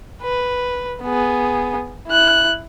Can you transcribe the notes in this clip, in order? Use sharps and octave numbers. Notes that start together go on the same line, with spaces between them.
B4
B3 G#4
E4 F#6